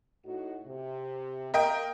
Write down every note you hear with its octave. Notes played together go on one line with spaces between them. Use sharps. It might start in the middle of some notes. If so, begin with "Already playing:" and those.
A2 D#4 F#4
C3
A#3 A#4 D#5 G5